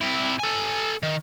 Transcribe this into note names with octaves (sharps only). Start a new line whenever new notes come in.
C3 E4
A4 G#5
D#3